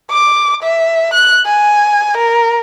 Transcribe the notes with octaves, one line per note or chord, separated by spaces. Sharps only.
D6
E5
F#6
G#5
A#4